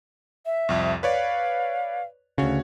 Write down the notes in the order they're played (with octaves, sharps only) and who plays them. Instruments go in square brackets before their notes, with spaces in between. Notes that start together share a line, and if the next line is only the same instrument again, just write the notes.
[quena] E5
[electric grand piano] C2 F2
[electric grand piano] B4 C#5 D5 [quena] F5
[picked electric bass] D2 C#3 [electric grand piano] F#4 C#5